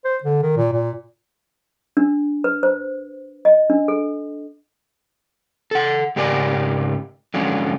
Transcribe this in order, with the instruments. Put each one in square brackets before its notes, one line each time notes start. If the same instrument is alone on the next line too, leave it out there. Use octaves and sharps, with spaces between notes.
[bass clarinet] C5
D3
D#3
A#2
A#2
[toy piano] D4
B4
C5
D#5
D4
A4
[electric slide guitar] A4 F#5
G#2 C#3 G4 A#4 D5 G#5
D3 F3 F#3 G#3 C#4